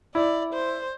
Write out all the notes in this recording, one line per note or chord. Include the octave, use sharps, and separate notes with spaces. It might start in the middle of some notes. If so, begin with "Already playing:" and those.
E4 D5
C5